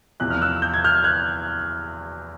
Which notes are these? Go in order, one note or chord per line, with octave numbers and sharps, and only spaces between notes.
E2 C3 F3 F#6
F6
E6 F#6
G6
G#6
F6 G6
F#6 G#6